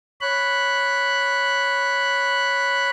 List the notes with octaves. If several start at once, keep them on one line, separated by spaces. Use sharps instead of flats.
C#5 B5 F#6